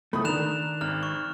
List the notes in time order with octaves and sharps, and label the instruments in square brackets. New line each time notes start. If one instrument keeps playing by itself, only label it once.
[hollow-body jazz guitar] C#2 A2 A3 [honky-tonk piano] B5 D#6
[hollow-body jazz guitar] D#3 [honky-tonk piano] D4 A#4 [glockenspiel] F#6 E7 F7
[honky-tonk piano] G#1 [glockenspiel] F6
[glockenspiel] C#6